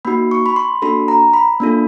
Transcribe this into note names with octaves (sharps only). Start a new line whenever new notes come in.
A#3 D#4 F#4 B5
C#6
B5
C6
A#3 D4 F#4 A4 B5
A#5
B5
A#3 D4 F4 A4